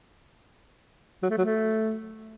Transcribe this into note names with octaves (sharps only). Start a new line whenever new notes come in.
F#3
A3
F#3
A3